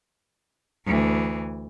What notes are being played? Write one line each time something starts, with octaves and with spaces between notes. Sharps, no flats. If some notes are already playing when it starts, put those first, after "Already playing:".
D2 E3